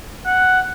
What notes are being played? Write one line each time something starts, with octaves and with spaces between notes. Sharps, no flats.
F#5